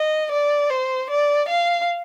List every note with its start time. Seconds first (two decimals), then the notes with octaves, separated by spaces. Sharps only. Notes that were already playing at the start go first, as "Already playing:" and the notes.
Already playing: D#5
0.31 D5
0.70 C5
1.10 D5
1.49 F5